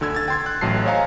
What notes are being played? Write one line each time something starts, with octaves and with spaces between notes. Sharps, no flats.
D2 D3 E6 G#6
G#6 A6
G5 C6 G#6
F#6
A1 A2 F#3 A5 C7
C5 C#5 D#5 F5 G#5 A#5